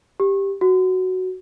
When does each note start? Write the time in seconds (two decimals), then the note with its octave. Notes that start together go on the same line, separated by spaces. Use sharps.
0.20 G4
0.61 F#4